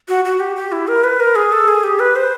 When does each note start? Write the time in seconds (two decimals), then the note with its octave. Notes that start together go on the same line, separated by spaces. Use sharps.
0.09 F#4
0.25 F#4
0.40 G4
0.56 G4
0.72 E4
0.88 A#4
1.04 B4
1.20 A#4
1.36 G#4
1.52 A4
1.68 G#4
1.83 G4
1.99 B4
2.16 C5